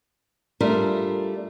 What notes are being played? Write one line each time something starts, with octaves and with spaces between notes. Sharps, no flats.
G3 A3 D4 F4 A#4